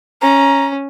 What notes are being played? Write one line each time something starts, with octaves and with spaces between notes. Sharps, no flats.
C#4 A#5